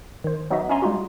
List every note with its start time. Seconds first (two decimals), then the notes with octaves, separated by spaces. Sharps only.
0.24 D#3 C5
0.50 F#3 B3 D#4 F#4 D#5 E5
0.69 C#4 D4 E5 G#5 A#5 C6
0.82 G3 G#3 D#4 F4 F#4